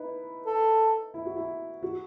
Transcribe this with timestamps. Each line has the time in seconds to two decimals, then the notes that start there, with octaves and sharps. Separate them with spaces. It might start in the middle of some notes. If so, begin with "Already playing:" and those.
Already playing: D#4 E4 B4
0.46 A4
1.14 E4
1.25 F#4
1.37 E4
1.83 F#4